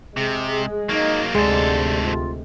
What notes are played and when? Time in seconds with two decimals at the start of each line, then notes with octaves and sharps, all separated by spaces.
0.17 C3 G#3 G#4
0.89 F#3 A#3 D#4
1.35 D2 G#2 C3 G#3 A4 D5
2.02 F4